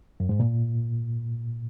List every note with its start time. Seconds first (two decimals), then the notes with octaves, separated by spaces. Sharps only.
0.20 F#2
0.29 G#2
0.40 A#2